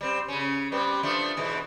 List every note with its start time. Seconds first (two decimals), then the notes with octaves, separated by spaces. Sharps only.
0.01 G3 C4
0.28 C#3 C#4
0.72 G3 B3 C4
1.03 F3 A3 D4
1.37 G#2 B2 E3